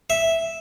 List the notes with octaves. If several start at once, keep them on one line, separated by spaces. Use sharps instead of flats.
E5